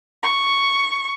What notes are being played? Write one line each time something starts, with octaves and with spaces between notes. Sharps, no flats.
C#6